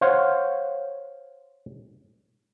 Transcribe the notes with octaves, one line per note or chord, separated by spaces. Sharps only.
C5 C#5 F5 F#5